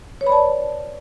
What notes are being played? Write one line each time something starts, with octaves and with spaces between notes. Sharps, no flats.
B4 C#5 D5 A5 B5